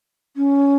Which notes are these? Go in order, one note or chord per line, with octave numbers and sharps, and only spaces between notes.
C#4